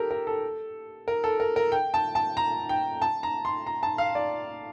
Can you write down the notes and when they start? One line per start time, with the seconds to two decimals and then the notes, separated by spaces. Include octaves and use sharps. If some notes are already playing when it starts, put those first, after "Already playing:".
Already playing: G4 A4 A#4
0.11 A#4
0.27 A4
1.08 A#4
1.24 A4
1.40 A#4
1.56 A#4
1.72 G5
1.94 A5
2.15 A5
2.37 A#5
2.69 G5
3.02 A5
3.23 A#5
3.45 C6
3.66 A#5
3.83 A5
3.98 F5
4.15 D5